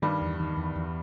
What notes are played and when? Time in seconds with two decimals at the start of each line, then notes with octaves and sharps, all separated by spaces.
0.02 G2 D#3 G3
0.21 E2
0.39 D#3
0.57 E2
0.76 E2